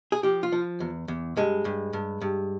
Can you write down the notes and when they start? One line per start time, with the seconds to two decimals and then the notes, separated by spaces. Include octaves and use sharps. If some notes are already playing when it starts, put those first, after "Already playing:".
0.12 G#4
0.23 F3 G4
0.43 F4
0.52 F3
0.80 E2
1.08 E2
1.37 G2 G#3
1.65 G2
1.93 G2
2.21 G2